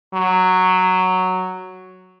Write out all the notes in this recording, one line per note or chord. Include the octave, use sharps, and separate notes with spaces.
F#3